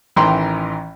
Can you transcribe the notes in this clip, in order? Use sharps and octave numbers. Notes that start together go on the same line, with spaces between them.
A1 D#3 E3 G5 A#5 C6